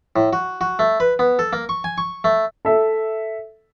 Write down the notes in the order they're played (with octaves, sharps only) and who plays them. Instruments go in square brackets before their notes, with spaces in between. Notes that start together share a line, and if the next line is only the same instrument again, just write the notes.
[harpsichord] A2
F#4
F#4
A3
B4
B3
A4
A#3
C#6
G#5
C#6
A3
[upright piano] A4 E5